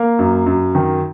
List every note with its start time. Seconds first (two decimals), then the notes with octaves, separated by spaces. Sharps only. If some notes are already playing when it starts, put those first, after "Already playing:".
Already playing: A#3 F5
0.19 F#2
0.46 F#2
0.75 D#3